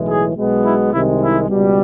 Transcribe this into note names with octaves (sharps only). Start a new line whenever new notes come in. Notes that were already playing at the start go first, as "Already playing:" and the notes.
Already playing: B1 A2 E3 G#3
G#4
B1 B2 G#3 B3
E4
C2 C3 D#3 G#3 E4
E4
C#2 B2 G3